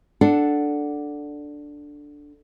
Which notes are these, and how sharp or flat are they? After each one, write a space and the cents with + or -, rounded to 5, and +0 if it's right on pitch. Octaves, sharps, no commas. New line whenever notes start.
D4 +0 A4 +0 F#5 +0